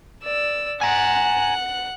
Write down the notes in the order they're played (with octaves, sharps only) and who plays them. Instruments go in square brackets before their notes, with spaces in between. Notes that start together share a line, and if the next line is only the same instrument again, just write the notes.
[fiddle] D5 E6
[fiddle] F#5 F#6 [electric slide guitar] G#5 A#5